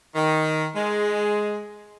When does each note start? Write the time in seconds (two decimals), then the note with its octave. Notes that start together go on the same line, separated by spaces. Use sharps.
0.15 D#3
0.75 G#3